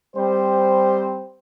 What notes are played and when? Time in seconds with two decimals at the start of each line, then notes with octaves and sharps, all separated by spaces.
0.16 G3 C4 C5